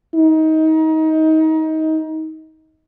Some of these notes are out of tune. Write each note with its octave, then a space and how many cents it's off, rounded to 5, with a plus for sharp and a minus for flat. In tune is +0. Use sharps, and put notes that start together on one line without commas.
D#4 +25